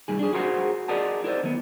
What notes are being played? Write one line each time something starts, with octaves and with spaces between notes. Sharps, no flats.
C2 G2 D#3 G#4
D4 G#4
F#4 G#4 A#4 C5 C#5 F#5
G#4 A#4 D5 D#5 F#5 A5
E4 A#4 C5 D5
D#3 B3